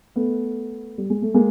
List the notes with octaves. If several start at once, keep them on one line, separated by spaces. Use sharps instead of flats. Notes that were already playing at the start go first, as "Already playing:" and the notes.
A3 B3
G3
G#3
A3
G#3 A#3